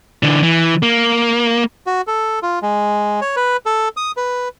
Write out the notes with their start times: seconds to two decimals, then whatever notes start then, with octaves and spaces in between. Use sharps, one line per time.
0.23 D3 E3
0.43 E3
0.83 A#3
1.87 F#4
2.07 A4
2.43 F4
2.62 G#3
3.21 C#5
3.36 B4
3.66 A4
3.97 D#6
4.17 B4